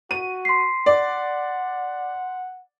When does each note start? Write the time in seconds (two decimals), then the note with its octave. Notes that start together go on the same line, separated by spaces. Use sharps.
0.11 F#4 D#7
0.45 C6 B6 C7
0.86 D5 F#5